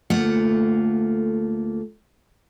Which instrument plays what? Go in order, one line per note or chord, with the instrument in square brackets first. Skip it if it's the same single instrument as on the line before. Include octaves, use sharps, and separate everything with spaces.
[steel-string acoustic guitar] D2 A3 A#3 F4 F#5